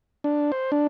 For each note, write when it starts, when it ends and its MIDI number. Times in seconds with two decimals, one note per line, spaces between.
0.24 0.52 62
0.52 0.71 72
0.72 0.87 62